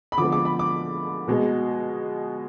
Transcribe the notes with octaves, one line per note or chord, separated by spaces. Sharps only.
B5
D3 F3 G#3 B3 D6
D6
B5
D6
B2 G#3 B3